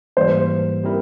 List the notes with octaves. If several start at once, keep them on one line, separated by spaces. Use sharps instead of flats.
G#2 E3 G3 A#3 C5
G3 C4 E4 A#4